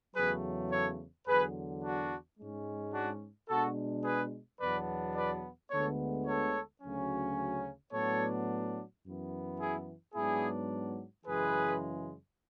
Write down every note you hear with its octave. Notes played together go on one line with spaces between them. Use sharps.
E2 C#3 F#3 A3 G#4 B4
A4 C#5
E2 D3 F#3 G#4 B4
D4 F#4
G#2 G#3 C#4
D4 F#4
B2 G#3 D4 F#4 A4
G#4 B4
E2 B2 F#3 B3 D4 B4 D5
B4 D5
D2 D3 G#3 B3 A4 C#5
A4 C#5
D2 C#3 F#3 C#4
A2 F#3 B3 D4 A4 C#5
F#2 E3 B3
E4 G#4
G#2 F#3 B3 D4 E4 G#4
F#2 C#3 E3 G#3 G#4 B4